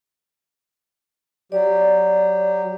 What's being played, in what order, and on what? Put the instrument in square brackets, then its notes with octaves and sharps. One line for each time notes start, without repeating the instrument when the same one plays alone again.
[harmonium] F#3 G4 [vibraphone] D5